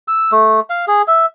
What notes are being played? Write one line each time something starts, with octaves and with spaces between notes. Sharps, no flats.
E6
A3
F5
G#4
E5